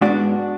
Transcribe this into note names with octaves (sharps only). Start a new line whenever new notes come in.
G#2 G#3 B3 D4 F#4